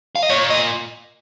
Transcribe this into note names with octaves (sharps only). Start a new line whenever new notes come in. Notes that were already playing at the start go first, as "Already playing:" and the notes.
F5
D#5
A#2 C#5
D#5